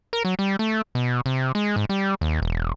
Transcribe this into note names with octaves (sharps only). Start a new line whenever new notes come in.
A#4
F#3
G3
A3
B2
C3
G#3
G#2
G3
D#2
E1